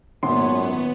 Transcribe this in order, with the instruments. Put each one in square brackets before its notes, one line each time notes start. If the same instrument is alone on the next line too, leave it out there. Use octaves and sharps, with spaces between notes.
[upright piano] G#1 C6 [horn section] F#2 [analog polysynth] A#2 C#5 [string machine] B3